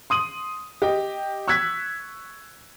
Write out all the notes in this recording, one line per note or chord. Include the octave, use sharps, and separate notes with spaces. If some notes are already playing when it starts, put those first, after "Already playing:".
C6 D#6 D#7 F#7
G4 D#5 G5
C#6 E6 F#6 G#6 B6